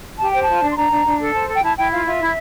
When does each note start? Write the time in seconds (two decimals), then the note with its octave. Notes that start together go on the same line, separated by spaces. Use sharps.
0.18 G4 A5
0.30 C5 G5
0.42 A5
0.48 F4
0.62 D4
0.70 C6
0.76 D4 A#5
0.90 D4
1.05 D4
1.19 A4
1.33 C5 A5
1.48 A4
1.56 G5
1.62 E4 A5
1.77 E4 G5
1.91 F4 F5
2.06 F4 E5
2.20 E4